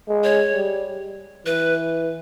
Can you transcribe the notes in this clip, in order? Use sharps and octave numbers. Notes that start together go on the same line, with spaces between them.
G#3
C#5
G3
E3 B4